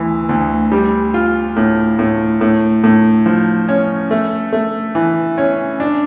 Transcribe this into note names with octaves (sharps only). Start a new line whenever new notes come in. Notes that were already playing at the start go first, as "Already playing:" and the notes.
Already playing: D2 E3
D2
G3
F4
A2
A2
A2
A2
F3
C#4
A3
A3
E3
C#4
D4